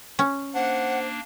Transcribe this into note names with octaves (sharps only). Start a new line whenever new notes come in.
C#4
A#3 D4 C5 F#5